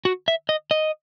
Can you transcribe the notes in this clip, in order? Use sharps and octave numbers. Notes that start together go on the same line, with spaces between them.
F#4
E5
D#5
D#5